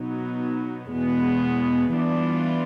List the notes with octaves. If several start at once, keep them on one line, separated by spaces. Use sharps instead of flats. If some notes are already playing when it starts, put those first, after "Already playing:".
Already playing: B2 F#3 B3 D#4
E2 B2 G#3 B3
E3 G3 B3 D4 F4